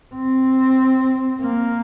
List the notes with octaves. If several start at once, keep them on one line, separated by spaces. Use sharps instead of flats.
C4
A#3